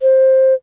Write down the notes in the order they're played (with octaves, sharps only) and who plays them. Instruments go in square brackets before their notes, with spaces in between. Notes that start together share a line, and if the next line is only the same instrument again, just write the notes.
[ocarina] C5